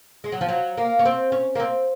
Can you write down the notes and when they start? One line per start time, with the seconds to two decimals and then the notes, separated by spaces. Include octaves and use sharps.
0.24 G#3
0.32 F#3
0.41 F3
0.49 F#3
0.78 A#3
0.99 C#4
1.05 C4
1.32 C#4
1.55 A#3
1.60 C4